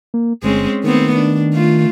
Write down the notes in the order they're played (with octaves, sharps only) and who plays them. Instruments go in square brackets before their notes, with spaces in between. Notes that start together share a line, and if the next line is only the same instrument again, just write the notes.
[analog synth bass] A#3
[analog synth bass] G1 [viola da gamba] G#3 C4 C#4
[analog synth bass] D#3 [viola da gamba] A3 B3 C4
[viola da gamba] D4
A3 F4